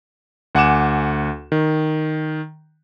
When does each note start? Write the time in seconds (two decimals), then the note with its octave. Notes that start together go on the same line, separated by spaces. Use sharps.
0.55 D2 F#5 G#5 D6 E7
1.52 D#3